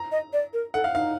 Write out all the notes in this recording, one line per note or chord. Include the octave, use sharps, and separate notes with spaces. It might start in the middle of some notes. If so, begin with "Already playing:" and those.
Already playing: A#5
D#5
D5
A#4
A4 F#5
F5
D#4 F5